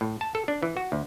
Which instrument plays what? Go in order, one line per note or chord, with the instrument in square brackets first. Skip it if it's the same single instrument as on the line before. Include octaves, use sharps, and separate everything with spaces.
[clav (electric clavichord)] A2
A5
A4
D4
E3
F#4
D2